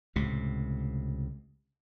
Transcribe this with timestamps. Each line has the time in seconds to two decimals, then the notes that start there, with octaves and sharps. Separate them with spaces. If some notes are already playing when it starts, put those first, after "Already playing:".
0.16 C#2 A2 C3